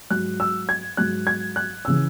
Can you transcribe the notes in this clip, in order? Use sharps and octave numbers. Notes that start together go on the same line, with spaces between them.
G#2 F#3 F#6
E6
G#6
G#2 F#3 F#6
G#6
F#6
C#3 E3 E6